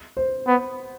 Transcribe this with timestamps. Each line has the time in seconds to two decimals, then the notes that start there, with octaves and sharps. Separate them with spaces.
0.17 C5
0.47 B3